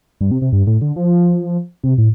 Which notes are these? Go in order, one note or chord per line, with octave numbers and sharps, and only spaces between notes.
G2
C3
C3
G2
A2
D3
F3
C3
A2